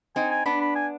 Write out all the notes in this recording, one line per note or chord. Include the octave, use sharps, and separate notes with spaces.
C4 D#4 G#5
G#5
B3 D4 B5
B5
G#5